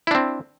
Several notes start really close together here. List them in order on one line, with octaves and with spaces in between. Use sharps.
E4 D4 C4